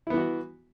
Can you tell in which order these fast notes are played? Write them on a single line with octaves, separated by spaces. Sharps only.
E4 B3 E3 F#4